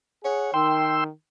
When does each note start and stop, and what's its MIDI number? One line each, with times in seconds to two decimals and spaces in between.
0.24 0.53 68
0.24 0.53 73
0.24 0.53 78
0.54 1.09 51
0.54 1.04 79
0.54 1.04 84
0.54 1.04 88